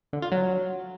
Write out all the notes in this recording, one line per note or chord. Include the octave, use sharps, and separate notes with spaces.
D3
F4
F#3